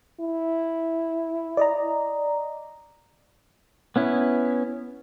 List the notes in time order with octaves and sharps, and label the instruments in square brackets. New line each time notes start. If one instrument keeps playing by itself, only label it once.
[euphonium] E4
[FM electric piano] D5 D#5 A#5
[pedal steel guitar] B3 C#4 E4